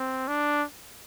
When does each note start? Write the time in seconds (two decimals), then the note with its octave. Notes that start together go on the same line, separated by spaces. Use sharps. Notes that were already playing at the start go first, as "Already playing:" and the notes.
Already playing: C4
0.28 D4